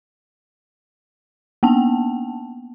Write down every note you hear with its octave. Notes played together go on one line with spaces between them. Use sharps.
A#3 B3 A5